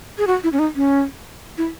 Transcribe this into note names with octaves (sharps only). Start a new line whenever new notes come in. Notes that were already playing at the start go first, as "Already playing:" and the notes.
G#4
F#4
E4
C#4
D#4
C#4
E4